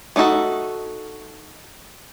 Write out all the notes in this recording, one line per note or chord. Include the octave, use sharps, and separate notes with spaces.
A3 D4 D#4 F#4 A4